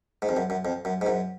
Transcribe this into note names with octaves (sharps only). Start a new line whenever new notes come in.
G#2
F2
F#2
F#2
F2
F#2
G#2
F#2